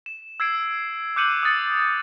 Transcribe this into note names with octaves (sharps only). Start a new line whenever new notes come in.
E7
E6 G#6 C7 D7
D6 F#6 G6 C#7 D#7 F#7
D#6 A6 C#7